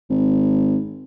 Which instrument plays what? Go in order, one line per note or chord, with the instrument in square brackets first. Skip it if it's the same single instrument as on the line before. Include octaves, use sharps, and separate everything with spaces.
[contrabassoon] G#1